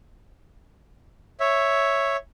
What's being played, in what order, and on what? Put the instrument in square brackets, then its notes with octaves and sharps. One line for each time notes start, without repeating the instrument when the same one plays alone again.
[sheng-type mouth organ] C#5 E5